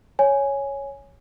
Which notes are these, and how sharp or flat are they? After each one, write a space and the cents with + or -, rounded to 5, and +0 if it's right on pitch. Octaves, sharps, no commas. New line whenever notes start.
C#5 +0 G#5 +0